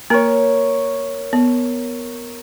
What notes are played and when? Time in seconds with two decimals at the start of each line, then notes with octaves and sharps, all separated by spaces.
0.10 A#3 A#4 C#5
1.33 B3